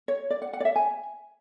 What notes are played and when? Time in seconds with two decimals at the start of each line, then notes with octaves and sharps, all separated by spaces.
0.08 C#5
0.30 D5
0.42 F#5
0.53 F#5
0.60 D5
0.65 E5
0.76 G#5